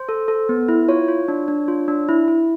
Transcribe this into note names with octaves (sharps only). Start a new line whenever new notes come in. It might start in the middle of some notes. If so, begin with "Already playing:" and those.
Already playing: C5
A4
A4
B3
E4
F4 C#5
F4
D4
D4
F4
D4
E4
E4